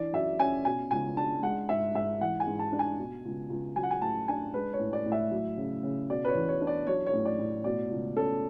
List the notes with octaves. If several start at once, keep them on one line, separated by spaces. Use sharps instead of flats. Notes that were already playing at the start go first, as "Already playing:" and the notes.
Already playing: E3 D4 D5
F#2 E5
C#4 G#5
B2 G#5
C#2 G#5
D4 A5
G#3 F#5
G#2 E5
G#2 E5
E3 F#5
G#5
G#2
A5
D4
G#5
B2
C#2
C#2
F#3 G#5
F#5
G#5
A2 A5
D4 G#5
G#3 B4
C#5
A2
D5
A2
E5
F#3
C#3
C#3
B2 D5
B4
C#5
E2
C#5
D4
D5
F#3 C#5
C#5
A2
D5
A2
B2 D5
C#2
C#4 A4